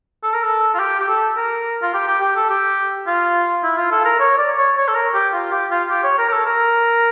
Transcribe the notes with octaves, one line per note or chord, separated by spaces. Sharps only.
A4
A#4
A4
F4
G4
G4
A4
A#4
F4
G4
G4
G4
A4
G4
F4
E4
F4
A4
A#4
C#5
D5
C#5
C#5
A4
A#4
G4
F4
G4
F4
G4
C#5
A#4
A#4
A4
A#4